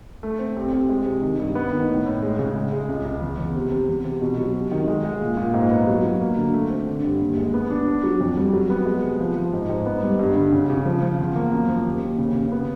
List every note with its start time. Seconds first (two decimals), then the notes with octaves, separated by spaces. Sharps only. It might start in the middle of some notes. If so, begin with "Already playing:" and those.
0.23 A3
0.39 C4
0.56 C2
0.73 C2
0.89 G#3
1.06 C3
1.22 D#3
1.38 G2
1.55 B3
1.72 D#3
1.89 A2
2.06 A2
2.22 G#3
2.39 C#3
2.55 G#3
2.72 G#3
2.89 C#2
3.05 C#2
3.21 E2
3.38 E2
3.55 C3
3.72 C3
3.89 E2
4.05 C3
4.22 B2
4.37 F#3
4.54 C3
4.72 D#3
4.88 G#3
5.04 G#3
5.21 A#2
5.37 A#2
5.54 G#2
5.71 B3
5.87 F#3
6.05 F#3
6.21 A#3
6.37 D3
6.54 A3
6.70 C4
6.87 D3
7.04 G2
7.21 D#2
7.37 G#3
7.54 B3
7.70 D4
7.87 D4
8.04 F#3
8.21 F2
8.37 G3
8.53 F#3
8.70 B3
8.86 G#3
9.03 C3
9.20 F3
9.36 F3
9.53 G#2
9.69 G#2
9.86 B3
10.03 G3
10.19 G2
10.36 D3
10.52 C#3
10.70 C#3
10.85 F3
11.02 F3
11.20 E2
11.35 A#3
11.53 F#2
11.68 F3
11.85 D#2
12.02 D#2
12.18 C#3
12.35 C#3
12.52 B3